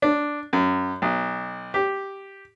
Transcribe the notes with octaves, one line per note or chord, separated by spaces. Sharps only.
D4
F#2
B1
G4